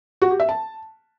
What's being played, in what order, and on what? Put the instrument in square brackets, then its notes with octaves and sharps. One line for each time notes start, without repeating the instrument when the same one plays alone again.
[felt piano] F#4
G4
E5
A5